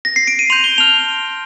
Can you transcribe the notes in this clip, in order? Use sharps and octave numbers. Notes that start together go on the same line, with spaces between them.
A#6
C7
D7
D#7
C6 G6 F7
G7
A5 C6 F6 F7